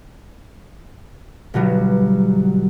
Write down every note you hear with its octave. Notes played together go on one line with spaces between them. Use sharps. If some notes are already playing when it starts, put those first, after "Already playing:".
G1 B2 F#3 G3